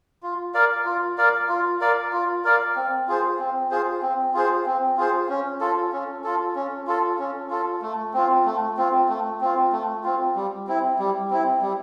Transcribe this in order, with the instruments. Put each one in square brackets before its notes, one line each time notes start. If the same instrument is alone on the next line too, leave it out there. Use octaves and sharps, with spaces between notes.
[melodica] F4
A#4 D5 F5
F4
A#4 D5 F5
F4
A#4 D5 F5
F4
A#4 D5 F5
C4
F4 G#4 C5
C4
F4 G#4 C5
C4
F4 G#4 C5
C4
F4 G#4 C5
C#4
F4 A4
C#4
F4 A4
C#4
F4 A4
C#4
F4 A4
A3
C4 F4
A3
C4 F4
A3
C4 F4
A3
C4 F4
G3
C4 E4
G3
C4 E4
G3